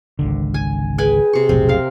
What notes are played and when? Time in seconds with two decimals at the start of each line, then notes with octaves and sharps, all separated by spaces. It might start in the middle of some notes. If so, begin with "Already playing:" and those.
0.19 G#1 C#2 D3
0.54 G#5
0.98 G#4 B4 G5 G#5
1.33 C3 C#6
1.49 F1 B1 A2 C4
1.69 A#4 F5